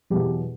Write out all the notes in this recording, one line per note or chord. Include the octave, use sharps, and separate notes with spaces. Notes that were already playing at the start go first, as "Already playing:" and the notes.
E2 B2 F#3 G4